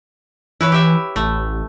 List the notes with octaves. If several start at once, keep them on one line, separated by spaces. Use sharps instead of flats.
E3 E4 B4 C#5
G4 E5
A1 A3